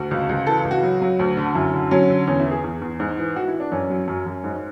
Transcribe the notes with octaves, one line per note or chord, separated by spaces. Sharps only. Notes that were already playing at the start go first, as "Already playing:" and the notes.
Already playing: D2 F#4
C#2
C#2
E3 A4
C#2
F#4
F#3
F#3
D2
D3
F#2 E4
D3
F#3 C#4
D3
E2 C#4
E4
E3
G#4
E2
E2
G#2
E3
E3 F#4
E4
E3
D4
F#2 C#4
F#3
F#2
F#2
G#2